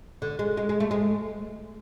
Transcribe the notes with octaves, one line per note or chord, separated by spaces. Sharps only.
D3
G#3
G#3
G#3
A3
G#3